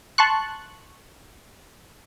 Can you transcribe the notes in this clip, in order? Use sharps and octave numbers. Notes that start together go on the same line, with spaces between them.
A5 C6 C#6 F#6